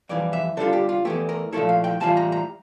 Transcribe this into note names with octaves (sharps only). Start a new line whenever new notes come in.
F2 E3 G3 D5
E5
D3 G3 D4 F4 A4
G4
F4
E2 E3 A3 G4
A#4
A#2 F3 A3 E4 A4
F5
G5
A2 E3 G3 D4 F4 A5
A#5
A#5